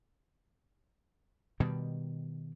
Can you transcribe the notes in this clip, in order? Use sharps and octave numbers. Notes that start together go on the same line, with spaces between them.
B2 D#3 G3